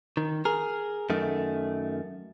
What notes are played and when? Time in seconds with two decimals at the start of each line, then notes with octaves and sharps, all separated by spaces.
0.17 D#3
0.45 G#4 A#4
1.10 F#2 D#3 A3